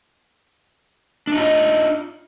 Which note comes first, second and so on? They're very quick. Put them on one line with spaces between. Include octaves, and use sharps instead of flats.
D4 D#4 F4 D#5